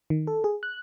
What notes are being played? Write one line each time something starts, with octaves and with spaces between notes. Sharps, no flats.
D#3
A4
G#4
F#6